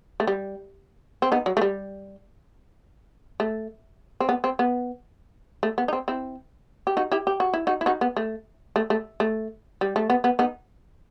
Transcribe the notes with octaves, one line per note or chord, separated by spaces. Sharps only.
A3
G3
C4
B3 D#4
F#3
A3
G3
A3
C4
B3
C4
B3
A3
B3
D#4
C4
C4 E4
G4
D#4 F#4
E4 G4
G4
F#4
E4
D#4 F#4
E4
D#4 F#4
B3
A3
A3
A3
A3
G3
A3
B3
B3
B3 D#4